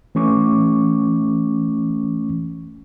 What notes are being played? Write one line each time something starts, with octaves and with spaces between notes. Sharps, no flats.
E3 A3 C#4 C#6 D6